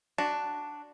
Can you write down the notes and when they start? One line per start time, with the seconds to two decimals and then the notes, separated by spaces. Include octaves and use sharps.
0.18 D4 F#4